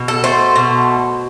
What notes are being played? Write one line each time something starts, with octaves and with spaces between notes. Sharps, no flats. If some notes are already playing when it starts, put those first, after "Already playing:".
Already playing: B2
A4
A3 C5
B2